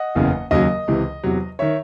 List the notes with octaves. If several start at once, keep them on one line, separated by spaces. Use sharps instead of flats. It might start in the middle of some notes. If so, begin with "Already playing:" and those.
Already playing: D#5 F#5
F#1 E2 C#3 E3
D#2 C#3 F#3 D#5
C#2 C3 E3
E2 C3 F#3
D#3 C#5 E5